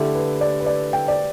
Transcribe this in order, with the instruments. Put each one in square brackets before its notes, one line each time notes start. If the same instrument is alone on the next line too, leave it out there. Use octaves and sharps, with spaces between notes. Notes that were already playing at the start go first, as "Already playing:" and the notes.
Already playing: [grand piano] D3 A3 E4 [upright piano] G4
[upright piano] B4
D5
B4
D5
G5
D5